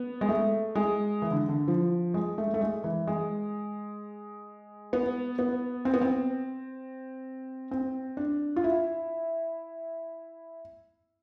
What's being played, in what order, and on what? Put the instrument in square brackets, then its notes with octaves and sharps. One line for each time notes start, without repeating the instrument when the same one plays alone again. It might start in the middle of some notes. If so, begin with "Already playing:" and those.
Already playing: [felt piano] B3
G#3
A3
G#3
E3
D3
D3
F3
G#3
A3
A3
G#3
E3
G#3
B3
B3
C4
B3
C4
C4
D4
F4
E4